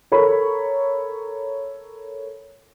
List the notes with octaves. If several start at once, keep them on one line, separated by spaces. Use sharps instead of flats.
A4 A#4 C#5 B5